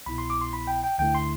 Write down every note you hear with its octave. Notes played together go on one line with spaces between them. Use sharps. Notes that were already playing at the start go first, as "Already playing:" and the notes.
C2 B2 B3 E4 B5
C6
D6
C6
B5
G5
G5
D2 D3 A3 E4 G5
C6